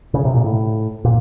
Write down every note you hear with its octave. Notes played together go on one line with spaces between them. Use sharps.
C#3
C3
A#2
A2
A#2